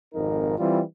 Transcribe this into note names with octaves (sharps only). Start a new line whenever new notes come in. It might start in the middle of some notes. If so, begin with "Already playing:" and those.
G#1 F2 G#2 D#4 A#4
E3 G3 C4 F4